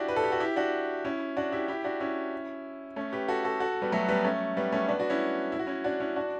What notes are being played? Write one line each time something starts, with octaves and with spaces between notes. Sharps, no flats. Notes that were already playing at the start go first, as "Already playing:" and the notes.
Already playing: D4 E4 F#4 G4
B4
A4
G4
F#4 A4
E4 G4
D4 F#4
C#4 E4
D4 F#4
E4 G4
E4 G4
D4 F#4
C#4 E4
A3 C#4
G4 B4
F#4 A4
F#4 A4
F#4 A4
G3 B3
F#3 A3
G3 B3
A3 C#4
G3 B3
A3 C#4
B3 D4
D4 F#4
C#4 E4
E4
F#4
C#4 E4
D4 F#4
C#4 E4
D4 F#4